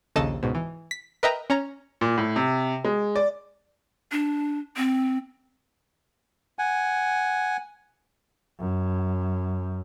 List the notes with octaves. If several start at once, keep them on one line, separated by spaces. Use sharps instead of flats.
A#1 D#2 C#3 A4 D#5 A5
C#2 G#2 B2
E3
B6
A#4 B4 D#5 E5 G5 A#5
C#4 C#5 A#5
A#2
A2
C3
G#3
D5
D4
C4
F#5 G#5
F#2